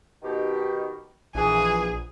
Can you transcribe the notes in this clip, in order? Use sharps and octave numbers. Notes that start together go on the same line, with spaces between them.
B2 D#3 G4
A#1 E3 G#4